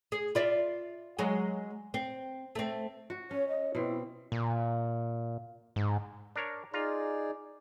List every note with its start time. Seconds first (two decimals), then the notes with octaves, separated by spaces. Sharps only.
0.12 G#4
0.35 F4 D5 E5
1.19 F#3 G#3
1.94 C4
2.55 A3 C4
3.10 F#4
3.31 C#4 C#5
3.48 D#5
3.75 B2 C4 E4
4.32 A#2
5.76 G#2
6.36 D4 A#4 C#5
6.74 D#4 F4 G#4 D5 A#5